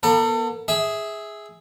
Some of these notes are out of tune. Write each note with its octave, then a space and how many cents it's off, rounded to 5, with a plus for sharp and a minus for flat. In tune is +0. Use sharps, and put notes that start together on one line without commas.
B3 -40 A4 +35
G#4 +0 E5 -15